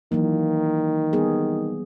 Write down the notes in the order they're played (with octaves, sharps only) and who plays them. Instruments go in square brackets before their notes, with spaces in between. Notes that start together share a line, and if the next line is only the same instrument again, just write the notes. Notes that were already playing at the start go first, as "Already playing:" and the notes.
[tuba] D#3 [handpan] E3 F#3 A#3
[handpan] G3 B3 G#4